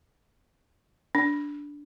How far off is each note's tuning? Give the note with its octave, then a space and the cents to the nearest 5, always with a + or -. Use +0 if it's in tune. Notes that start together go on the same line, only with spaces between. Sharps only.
D4 -10